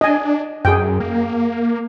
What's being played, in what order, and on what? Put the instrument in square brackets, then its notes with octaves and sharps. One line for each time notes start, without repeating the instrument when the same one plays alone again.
[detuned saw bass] D4 [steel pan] D#5 G#5
[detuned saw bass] F#2 [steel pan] G#4 G5
[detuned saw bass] A#3